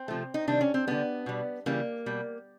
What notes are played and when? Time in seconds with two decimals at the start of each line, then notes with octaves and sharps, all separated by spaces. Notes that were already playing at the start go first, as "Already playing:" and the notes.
Already playing: C4
0.08 C3 F3 A3
0.34 D#4
0.47 C3 D#3 G3 D4
0.61 C#4
0.74 C4
0.87 D3 G3 B3
1.26 B2 G3
1.66 C#3 E3 G3 A#3
2.06 B2 G3